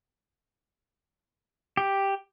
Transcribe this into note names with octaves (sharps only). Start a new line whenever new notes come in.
G4